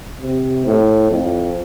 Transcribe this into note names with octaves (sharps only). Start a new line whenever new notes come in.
C3
A2
F2